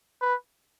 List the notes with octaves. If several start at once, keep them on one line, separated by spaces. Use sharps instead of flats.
B4